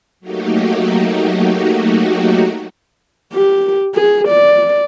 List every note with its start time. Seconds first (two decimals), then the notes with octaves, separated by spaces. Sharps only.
0.20 F#3 A3 A#3 D#4 F#4 G4
3.33 G4
3.94 G#4
4.28 D5